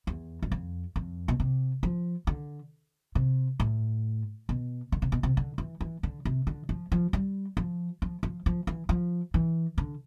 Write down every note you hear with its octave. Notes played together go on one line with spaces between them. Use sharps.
E2
G2
F2
F2
B2
C3
F3
D3
C3
A2
B2
D3
C3
B2
C3
D3
E3
E3
D3
C3
D3
F3
F3
G3
F3
F3
F3
F3
E3
F3
E3
D3